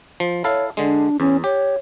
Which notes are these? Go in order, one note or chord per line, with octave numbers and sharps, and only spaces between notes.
F3
E4 A4 C#5 F5
D3 G#3 D4
E2 C#4
G4 C#5